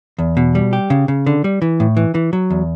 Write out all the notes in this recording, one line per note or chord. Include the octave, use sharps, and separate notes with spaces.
E2
B2
G3
G4
C#3
C#3
D3
G3
E3
A2
E3
E3
F#3
E2